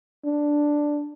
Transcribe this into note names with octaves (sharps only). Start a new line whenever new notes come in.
D4